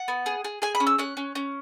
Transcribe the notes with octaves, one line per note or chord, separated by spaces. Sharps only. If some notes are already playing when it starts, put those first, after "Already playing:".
Already playing: F#5
B3
G#4
G#4
G#4 G#5
B5
C#4
E6
C#4 F#6
C#4
C#4